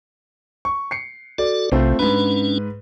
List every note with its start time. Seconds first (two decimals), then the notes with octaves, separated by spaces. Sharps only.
0.65 C#6
0.91 C7 C#7
1.38 F#4 A4 D5
1.72 B1 C3 A3 C4 F4
1.99 G#2 C#4 D4 B4